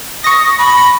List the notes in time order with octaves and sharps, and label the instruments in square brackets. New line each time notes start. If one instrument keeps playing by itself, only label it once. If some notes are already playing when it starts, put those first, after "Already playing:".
[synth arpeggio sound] C#6 A#6 [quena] D#6
[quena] B5